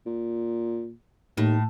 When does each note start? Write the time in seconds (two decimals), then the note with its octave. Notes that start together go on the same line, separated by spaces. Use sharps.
0.06 A#2
1.37 D#2 A2